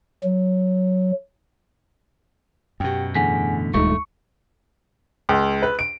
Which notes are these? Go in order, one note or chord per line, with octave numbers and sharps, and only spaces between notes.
F#3
F#2 B2 G4 F#5 G5
E2 A2 D3 G#4 F#5 G#5 B6
D#1 D2 G2 G#3 A3 D#4 C#6 C#7
C#2
B4
D7